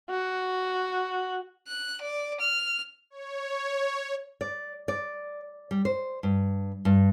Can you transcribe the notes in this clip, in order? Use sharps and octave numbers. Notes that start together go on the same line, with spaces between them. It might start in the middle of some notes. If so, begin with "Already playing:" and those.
F#4
F#6
D5
F6
C#5
D5
D5
G3
C5
G2
G2